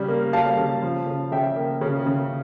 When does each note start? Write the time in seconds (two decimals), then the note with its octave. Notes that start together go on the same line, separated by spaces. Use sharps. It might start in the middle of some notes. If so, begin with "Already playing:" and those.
Already playing: C#3 G3
0.08 A#3
0.33 G3 F5 A5
0.57 C#3
0.83 F3
1.07 C#3
1.32 C#3 E5 G5
1.56 A#3
1.81 C#3
2.06 C#3